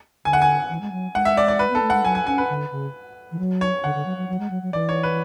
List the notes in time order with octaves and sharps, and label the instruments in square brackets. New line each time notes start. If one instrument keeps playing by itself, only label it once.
[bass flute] D3 [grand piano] G#5
[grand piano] F#5
G#5
[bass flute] E3
G#3
F#3
[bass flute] G#3 [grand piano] F#5
[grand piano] E5
D5
D5
B4
[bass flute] B3 [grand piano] A4
[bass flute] A3
[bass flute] G#3 [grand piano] F#5
[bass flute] F#3 [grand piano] G#5
[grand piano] G#5
[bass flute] C#4 [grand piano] G#5
[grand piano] B4
[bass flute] D3
C#3
E3
F#3
[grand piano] C#5
[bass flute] D3 [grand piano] F#5
[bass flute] D3
F#3
F#3
F#3
G#3
F#3
F#3
[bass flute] E3 [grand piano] D5
[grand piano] C#5
B4